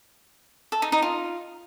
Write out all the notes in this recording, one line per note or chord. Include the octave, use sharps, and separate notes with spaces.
A4
D#4
D#4
F4